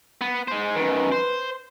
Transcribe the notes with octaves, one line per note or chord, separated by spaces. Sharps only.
B3
G#3 C5
F#2 D#3 B4
C5